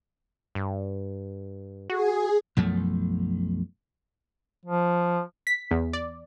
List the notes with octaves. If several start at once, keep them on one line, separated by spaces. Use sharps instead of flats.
G2
F#4 G#4
B1 F#2 F3 A3
F3
B6
E2
D5